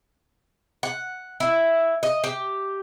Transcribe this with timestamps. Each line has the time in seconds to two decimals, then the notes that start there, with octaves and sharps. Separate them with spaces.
0.83 F#5
1.40 E4
2.03 D#5
2.24 G4